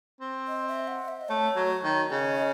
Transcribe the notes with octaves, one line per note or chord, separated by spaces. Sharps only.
C4
D#5
E5
F#5
E5
D#5
A3 C#5
F#3
D#3
C#3 D#5